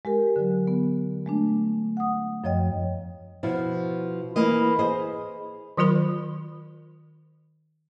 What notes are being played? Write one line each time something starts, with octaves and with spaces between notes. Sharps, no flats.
G#3 G4 A#4
D3 F#3
B3
G#3 A3 D4
F#5 D#6
F#2 F3 C#5 D#5 G5
B2 F3 E4
E3 A#3 D#5 B5
G#4 C5 D#5
D#3 F#3 F4 A#4 B5